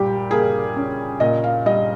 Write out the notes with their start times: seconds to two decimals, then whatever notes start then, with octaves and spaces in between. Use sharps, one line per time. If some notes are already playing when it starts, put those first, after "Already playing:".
Already playing: A#2 G3 G4
0.31 A#3 G#4
0.76 C#4
1.20 A#2 D#5
1.44 F5
1.66 G3 D#5